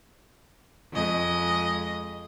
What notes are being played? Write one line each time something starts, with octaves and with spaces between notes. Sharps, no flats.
F2 G#3 D#5